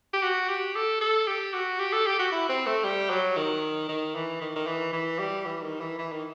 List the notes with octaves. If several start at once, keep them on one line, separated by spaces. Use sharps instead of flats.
G4
F#4
G4
A4
A4
G4
F#4
G4
A4
G4
F#4
E4
C4
A3
G3
F#3
D#3
D#3
E3
D#3
D#3
E3
E3
G3
E3
D#3
E3
E3
D#3